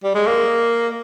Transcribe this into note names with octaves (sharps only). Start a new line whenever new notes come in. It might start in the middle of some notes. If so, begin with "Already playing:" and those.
G3
G#3
A#3